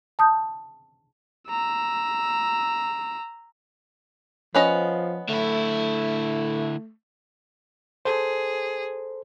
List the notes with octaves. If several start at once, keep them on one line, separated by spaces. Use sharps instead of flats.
A5 D#6 G6
A#5 E6
F3 B3 C#4 D#5
D3 A3 E4
G#4 A4 C5